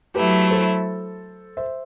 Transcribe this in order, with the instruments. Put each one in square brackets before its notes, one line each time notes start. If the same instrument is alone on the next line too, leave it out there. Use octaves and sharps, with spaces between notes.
[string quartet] F#3 A3 E4 [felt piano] G4 B4
[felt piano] A4 C5
C5 E5